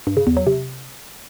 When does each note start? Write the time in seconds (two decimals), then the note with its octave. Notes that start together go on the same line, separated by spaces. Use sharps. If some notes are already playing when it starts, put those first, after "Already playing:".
0.07 G2
0.17 C#3
0.27 E2
0.37 F#3
0.47 C3